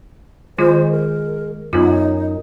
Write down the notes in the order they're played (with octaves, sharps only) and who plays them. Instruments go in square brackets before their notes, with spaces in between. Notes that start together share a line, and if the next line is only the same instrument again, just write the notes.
[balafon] D#3 F4 [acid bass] G#3 [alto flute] C5
[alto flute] A#4
[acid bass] F#2 [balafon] B3 F4 [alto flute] D#4